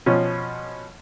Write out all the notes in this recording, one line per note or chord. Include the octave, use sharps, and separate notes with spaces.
B2 F3 C#4